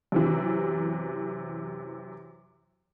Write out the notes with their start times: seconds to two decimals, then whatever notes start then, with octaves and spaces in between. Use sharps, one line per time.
0.12 F#2 C3 E3